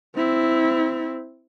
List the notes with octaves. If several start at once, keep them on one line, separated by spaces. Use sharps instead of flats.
C4 E4